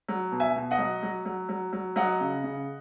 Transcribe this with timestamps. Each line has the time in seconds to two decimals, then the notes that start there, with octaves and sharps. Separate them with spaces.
0.09 F#3
0.32 B2
0.40 E5 G#5
0.56 B2
0.71 D#5 F#5
0.78 F#3
1.03 F#3
1.25 F#3
1.49 F#3
1.73 F#3
1.96 F#3 D#5 F#5
2.20 C#3
2.44 C#3